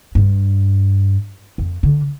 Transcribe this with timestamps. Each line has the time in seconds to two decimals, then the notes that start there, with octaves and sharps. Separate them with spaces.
0.15 G2
1.58 F2
1.83 D3